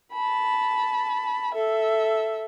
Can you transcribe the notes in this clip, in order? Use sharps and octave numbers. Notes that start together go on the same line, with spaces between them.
A5 B5
A4 E5